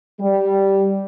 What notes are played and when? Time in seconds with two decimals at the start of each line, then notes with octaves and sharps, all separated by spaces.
0.19 G3